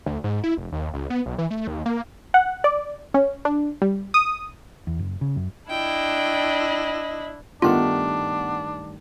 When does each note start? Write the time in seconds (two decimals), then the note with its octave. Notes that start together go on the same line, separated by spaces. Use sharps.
0.06 D2
0.24 G#2
0.44 E4
0.57 F1
0.72 D#2
0.94 C#2
1.10 B3
1.26 B1
1.38 E3
1.50 A3
1.67 D#2
1.86 A#3
2.34 F#5
2.64 D5
3.14 C#4
3.45 D4
3.82 G3
4.14 D#6
4.87 E2
4.99 F#1
5.21 C#3
5.36 F#2
5.70 D4 E4 D#5 G5
7.62 G2 D#3 A3 B3 D4 F4 F#5